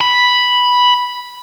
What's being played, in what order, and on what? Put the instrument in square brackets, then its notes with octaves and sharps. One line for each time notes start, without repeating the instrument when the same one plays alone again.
[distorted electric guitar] B5